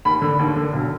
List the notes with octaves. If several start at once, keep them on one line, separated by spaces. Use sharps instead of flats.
D#2 B5
D3
D#2
D3
B1